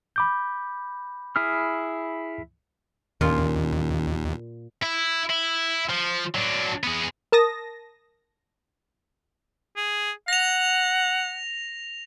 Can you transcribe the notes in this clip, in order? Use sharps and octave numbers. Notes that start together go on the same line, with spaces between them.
B5 D6 G6
E4 G#4 F6
D#2 A#2 D#3 C#4 F4 C6
E4
E4
F3
F#3 D4
B3 G#4
A#4 A5 D#6 A#6
G#4
F#5 A#6 F7